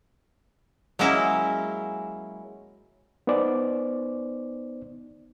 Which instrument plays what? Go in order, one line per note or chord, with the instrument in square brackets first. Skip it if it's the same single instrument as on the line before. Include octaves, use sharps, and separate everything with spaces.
[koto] F#3 G#3 A#3 C#4 E4
[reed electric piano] B3 D#4 C5 D5